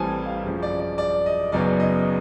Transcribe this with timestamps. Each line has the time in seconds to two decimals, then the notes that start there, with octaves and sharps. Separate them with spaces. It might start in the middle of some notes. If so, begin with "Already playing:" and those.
Already playing: A1 A2 E3 G3 C4 G#5 A5
0.26 F5
0.44 F#2 C#3 F3
0.62 D5
0.80 D5
0.98 D5
1.26 D#5
1.52 F#1 F#2 C#3 F#3 B3 D5
1.80 D#5